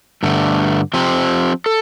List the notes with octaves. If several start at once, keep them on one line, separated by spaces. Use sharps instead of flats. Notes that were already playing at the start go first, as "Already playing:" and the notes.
G2 D3 A3
F3 C4 G4 C5
A4